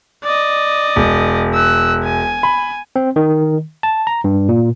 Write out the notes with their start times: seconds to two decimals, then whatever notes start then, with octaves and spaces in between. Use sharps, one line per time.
0.24 D5 D#5
0.96 E1
1.54 E6 F#6
2.04 G#5
2.43 B5
2.96 C4
3.16 D#3
3.83 A5
4.07 A#5
4.24 G2
4.49 A#2